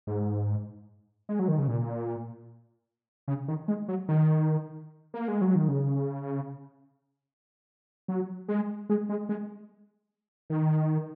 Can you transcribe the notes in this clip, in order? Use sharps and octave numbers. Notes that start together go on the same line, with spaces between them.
G#2
G#3
F#3
D#3
C#3
A#2
C#3
D#3
G#3
F#3
D#3
A#3
G#3
F#3
D#3
C#3
F#3
G#3
G#3
G#3
G#3
D#3